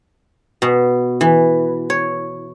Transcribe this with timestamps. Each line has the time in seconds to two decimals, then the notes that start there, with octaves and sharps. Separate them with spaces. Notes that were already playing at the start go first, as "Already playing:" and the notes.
0.62 B2
1.21 E3
1.90 C#5